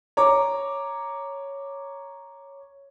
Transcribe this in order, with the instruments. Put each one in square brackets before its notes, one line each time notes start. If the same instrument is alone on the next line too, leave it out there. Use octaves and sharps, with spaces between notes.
[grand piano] C#5 A#5 D6